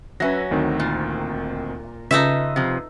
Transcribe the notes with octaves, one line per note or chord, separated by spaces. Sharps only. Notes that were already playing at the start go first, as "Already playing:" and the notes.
F#3 C#4 B4 E5 A#6
D2 D#3 C4
A#2
C#3 D#4 F4 A4 B4 E5
C3 F3